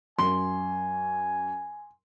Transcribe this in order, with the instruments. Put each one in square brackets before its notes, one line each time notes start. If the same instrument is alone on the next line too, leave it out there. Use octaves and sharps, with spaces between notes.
[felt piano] F#2 [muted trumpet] G#5 [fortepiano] C6